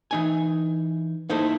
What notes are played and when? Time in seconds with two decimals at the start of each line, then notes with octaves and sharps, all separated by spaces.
0.11 E3 D#4 G#5
1.29 A#3 D#4 E4 A4 C5